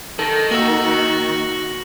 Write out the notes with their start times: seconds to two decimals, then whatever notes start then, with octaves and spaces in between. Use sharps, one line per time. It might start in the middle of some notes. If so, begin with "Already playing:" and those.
0.19 D#3 A4 A#6 F#7
0.51 A#3 F#4 E6 F#7